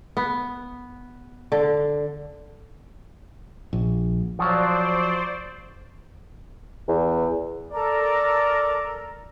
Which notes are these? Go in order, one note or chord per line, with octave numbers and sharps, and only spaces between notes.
B3
D3
A#1
F3 F#3 C5 D5
E2
A4 A#4 D5 A#5